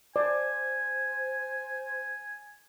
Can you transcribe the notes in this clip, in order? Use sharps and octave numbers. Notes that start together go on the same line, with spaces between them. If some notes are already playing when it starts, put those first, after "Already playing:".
C5 D5 G#5